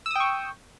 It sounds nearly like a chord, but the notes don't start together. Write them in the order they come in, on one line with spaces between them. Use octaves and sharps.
E6 D#6 G5 C#6